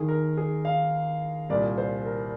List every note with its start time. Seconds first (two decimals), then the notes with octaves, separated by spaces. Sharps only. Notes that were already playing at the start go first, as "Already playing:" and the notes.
Already playing: D#2 D#3 G#4
0.08 A#4
0.37 G#4
0.65 F5
1.49 C2 A#2 D5
1.78 C5
2.06 A#4